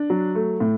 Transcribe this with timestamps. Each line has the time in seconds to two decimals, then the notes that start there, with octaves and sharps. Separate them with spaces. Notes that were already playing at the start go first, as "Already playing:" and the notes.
Already playing: D4
0.10 F#3
0.35 A3
0.60 A2